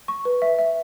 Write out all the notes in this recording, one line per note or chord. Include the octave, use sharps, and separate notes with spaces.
C#6
B4
E5
E5